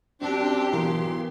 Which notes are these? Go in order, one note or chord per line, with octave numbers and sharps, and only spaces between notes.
F#2 C4 D4 G4
B1 E3 A#4 C6